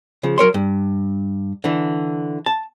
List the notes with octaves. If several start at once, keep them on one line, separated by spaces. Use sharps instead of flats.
C#3 F3
F#3 A#4 C#5 C6
G2
D3 E3
A5